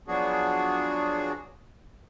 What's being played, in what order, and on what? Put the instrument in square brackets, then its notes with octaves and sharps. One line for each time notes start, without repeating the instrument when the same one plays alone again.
[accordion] F3 F#3 B3 D4 F#4 G#4